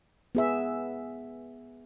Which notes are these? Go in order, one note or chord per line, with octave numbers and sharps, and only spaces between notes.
B3 G#4 E5